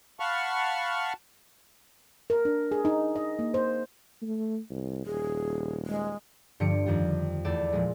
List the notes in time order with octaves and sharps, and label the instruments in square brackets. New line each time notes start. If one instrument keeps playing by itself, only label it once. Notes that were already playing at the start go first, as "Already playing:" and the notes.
[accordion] F5 F#5 A5 B5 C#6 F6
[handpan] A#4
D4
G#4
D#4
D#5
A#3
C5
[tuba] A3
C2
[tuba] D#1 [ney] G#4
[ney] G#3
[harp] G2 D3 F3 G3 C#7 D7
F2 D#3 G3
E2 A3 D5 E7
A#2 F3 G#3